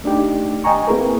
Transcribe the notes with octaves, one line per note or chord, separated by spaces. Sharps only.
A3 D4 D#4 G4
D#5 G5 G#5 A#5 C#6
A#3 C4 E4 G#4 A#4 B4